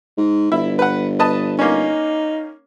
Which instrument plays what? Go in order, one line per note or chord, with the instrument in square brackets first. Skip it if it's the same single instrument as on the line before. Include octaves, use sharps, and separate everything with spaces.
[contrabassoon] G#2
[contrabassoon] G1 [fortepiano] E4
[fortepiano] B4 F#5
B4 D#5 A5
[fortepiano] A#3 C#4 [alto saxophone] D#4